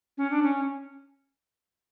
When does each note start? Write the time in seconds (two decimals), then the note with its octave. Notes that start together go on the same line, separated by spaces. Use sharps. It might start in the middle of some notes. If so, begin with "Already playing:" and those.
0.18 C#4
0.31 D4
0.42 C#4